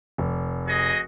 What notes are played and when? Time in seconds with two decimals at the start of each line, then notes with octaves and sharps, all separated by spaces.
0.18 F1
0.67 F#4 G#4 D#5